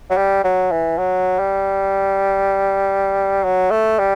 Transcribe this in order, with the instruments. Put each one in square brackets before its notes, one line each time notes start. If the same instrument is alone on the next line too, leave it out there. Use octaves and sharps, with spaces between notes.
[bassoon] F#3
G3
F#3
E3
F#3
G3
F#3
A3
G3